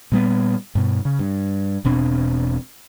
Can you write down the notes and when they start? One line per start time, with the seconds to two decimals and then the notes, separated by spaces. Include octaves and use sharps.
0.12 A#2 G3 B3
0.75 G2 B2
1.05 C#3
1.19 G2
1.85 E1 B2 C4 D4